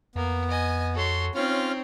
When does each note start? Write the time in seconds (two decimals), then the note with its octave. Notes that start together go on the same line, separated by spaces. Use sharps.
0.15 F2 A#3 B3
0.50 D#5 G#5
0.94 F#4 A4 C#5 C6
1.35 C4 C#4 D#4 F4 C#5 F6